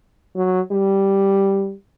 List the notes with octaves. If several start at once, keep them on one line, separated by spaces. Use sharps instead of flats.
F#3
G3